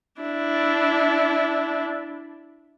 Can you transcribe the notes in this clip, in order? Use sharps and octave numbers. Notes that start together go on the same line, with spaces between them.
D4 E4